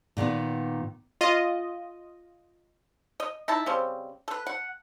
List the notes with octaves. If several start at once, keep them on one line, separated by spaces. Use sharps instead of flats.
A#2 D#3 A#3 B3
F4 D#5
D#5
D#4 E4 A5
C#3 G3 C4
A4 B4
F#5